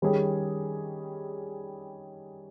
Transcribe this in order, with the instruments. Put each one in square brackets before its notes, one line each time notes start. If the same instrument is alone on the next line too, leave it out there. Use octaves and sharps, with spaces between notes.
[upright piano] D#3 G3 C#4 G#4